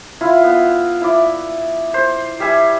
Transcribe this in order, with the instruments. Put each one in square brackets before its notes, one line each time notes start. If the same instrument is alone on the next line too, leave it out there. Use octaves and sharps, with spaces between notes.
[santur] E4 F4
B3
E4 D5
C5
G3 E5 G#5